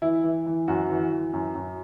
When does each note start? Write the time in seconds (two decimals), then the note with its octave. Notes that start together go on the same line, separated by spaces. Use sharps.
0.02 E3 E4
0.24 E3
0.46 E3
0.68 F#2 F#4
0.90 E3
1.11 E3
1.33 F#2
1.55 F#2